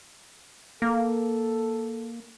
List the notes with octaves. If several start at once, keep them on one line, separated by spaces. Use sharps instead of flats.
A#3 A4